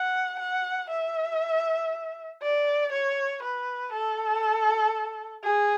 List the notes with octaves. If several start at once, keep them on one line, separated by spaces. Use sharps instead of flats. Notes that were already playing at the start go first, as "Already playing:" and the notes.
Already playing: F#5
F#5
E5
D5
C#5
B4
A4
G#4